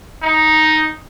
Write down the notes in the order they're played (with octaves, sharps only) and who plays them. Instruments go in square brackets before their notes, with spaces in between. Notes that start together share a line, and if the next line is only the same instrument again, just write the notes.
[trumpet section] D#4